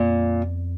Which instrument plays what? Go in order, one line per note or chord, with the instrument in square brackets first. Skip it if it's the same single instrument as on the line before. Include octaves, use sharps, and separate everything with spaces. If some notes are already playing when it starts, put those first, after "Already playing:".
Already playing: [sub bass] F2 [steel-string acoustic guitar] A#2